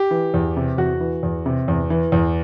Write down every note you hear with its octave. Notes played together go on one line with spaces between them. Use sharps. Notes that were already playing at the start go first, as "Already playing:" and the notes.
Already playing: G4
E3
E2
C3
E2 F#4
E3
E2
C3
E2
E3
E2